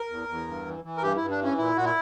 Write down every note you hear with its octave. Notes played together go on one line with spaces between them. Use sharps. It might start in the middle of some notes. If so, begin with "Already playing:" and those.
Already playing: A#4
E2
E2
G2
E3
E3
A#4
G2 G4
G2 E4
D4
E3 C#4
A#2 E4
A#2 F#4
E4